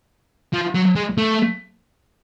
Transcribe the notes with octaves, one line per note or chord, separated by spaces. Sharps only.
F3
F#3
G#3
A3